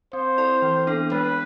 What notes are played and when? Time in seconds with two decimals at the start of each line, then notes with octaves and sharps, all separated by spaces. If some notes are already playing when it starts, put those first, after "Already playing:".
0.13 C4 C5
0.38 E4 A4 D5
0.62 E3
0.87 B3 D4 A4
1.12 G#3 B4